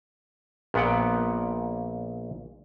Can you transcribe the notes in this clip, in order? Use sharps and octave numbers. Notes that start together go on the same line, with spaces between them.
A#1 A#2 B3 F#5 G5